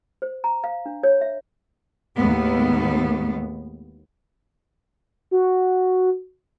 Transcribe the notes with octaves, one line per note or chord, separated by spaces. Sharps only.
C5
A#5
F5
D4
C#5
E5
D#2 A2 G#3 B3
F#4